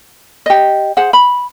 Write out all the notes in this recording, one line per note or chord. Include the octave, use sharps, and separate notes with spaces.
G4 D#5
G#4 C5 F#5
B5